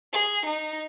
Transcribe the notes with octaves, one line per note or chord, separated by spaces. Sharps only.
G#4
D#4